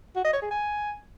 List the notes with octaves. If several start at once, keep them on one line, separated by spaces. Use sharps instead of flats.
F#4
D#5
C#5
G#4
G#5